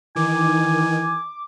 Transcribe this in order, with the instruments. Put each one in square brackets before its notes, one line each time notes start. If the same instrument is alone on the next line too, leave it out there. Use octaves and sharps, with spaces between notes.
[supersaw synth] D#3 [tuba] E3 [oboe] G#5 [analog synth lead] D6